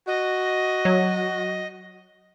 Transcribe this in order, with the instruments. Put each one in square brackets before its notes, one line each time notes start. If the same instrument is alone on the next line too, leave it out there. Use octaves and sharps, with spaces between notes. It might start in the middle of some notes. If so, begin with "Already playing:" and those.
[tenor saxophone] F#4 [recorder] D#5
[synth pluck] F#3